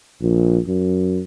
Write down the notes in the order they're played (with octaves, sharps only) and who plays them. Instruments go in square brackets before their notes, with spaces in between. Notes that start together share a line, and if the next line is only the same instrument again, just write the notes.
[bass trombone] A#1
F#2